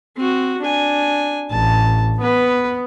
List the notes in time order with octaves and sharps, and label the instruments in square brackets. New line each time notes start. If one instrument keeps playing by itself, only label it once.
[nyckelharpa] C4 F#4
D4 G#5
[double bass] A1 [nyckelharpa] A5
[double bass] B3 [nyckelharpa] B4